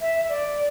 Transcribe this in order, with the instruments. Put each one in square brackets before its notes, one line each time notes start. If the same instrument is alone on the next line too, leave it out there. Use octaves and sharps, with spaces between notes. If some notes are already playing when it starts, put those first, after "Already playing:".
[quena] E5
D5